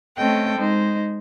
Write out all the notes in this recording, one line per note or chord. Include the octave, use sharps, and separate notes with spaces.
A3 C4 C#4 A4 D#5 G5
G#3 D#4 C5